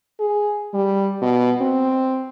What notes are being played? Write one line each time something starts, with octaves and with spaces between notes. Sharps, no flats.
G#4
G3
B2
C4